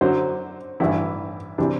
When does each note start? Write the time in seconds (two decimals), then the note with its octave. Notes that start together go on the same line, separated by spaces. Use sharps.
0.01 F#2 D3 F#3 C5
0.80 A1 G2 E3 E4
1.58 C3 E3 G3 D4